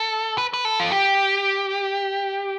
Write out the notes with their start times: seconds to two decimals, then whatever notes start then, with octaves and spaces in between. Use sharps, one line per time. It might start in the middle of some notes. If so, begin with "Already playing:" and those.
Already playing: A4
0.38 B4
0.53 B4
0.65 A4
0.80 F4
0.92 G4